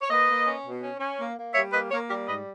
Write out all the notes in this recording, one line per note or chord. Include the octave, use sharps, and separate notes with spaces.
C#5
A#3 B4 D#5
A#3
C#4
B2
C#4
C#4
A#3
A#3
G3 C#5 E5
A#3 B4 D#5
A#3 A#4 C#5
G3 G4 A#4
G#2 B4 D#5